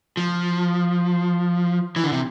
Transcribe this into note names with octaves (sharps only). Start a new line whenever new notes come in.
F3
E3
D3
C3